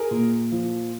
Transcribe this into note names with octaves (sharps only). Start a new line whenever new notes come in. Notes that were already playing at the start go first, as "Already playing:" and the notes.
Already playing: G#4 A#4
A#2
F3